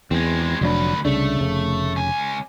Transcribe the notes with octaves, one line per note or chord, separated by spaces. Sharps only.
E2 G#3 C4
F1 D2 F#3 D4 B4
C2 C#3 A3 D4
F1 C#3
C#2 G#5